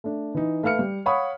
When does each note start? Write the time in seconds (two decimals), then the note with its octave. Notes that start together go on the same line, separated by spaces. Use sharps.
0.04 A3 D4
0.35 E3 D#4
0.63 A3 B4 F5 F6 C#7
0.79 G3
1.06 C#5 F5 F#5 B5 C#6 D#6